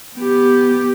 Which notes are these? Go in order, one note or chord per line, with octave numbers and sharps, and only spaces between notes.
B3 G4